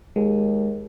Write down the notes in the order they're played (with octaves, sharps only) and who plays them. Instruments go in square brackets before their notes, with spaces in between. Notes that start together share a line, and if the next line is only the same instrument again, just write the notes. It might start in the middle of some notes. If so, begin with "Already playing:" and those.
[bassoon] D#2 [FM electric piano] G#3